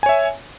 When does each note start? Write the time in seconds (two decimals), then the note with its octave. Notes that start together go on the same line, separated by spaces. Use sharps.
0.03 G#5
0.06 C#5
0.09 E5